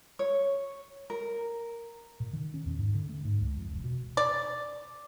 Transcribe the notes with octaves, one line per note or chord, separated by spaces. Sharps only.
C#5
A#4
A#2
D#3
C#4
E2
G#2
D3
A3
G#2
C#2
F2
E1
B2
D5